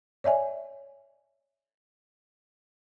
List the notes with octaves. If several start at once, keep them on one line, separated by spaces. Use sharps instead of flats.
C#5 D5 E5 G#5